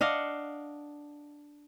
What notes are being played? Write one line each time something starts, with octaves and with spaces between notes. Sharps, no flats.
D4 D#5 F5 F#5